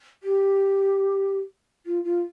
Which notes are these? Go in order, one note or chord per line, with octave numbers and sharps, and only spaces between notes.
G4
F4
F4